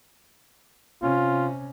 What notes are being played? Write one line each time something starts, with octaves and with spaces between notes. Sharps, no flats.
C3 C#4 F4